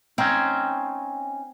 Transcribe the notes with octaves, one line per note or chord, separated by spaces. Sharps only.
C4 C#4 D#4